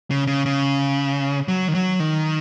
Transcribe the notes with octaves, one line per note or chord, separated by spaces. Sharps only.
C#3
C#3
C#3
F#3
D#3
F#3
D#3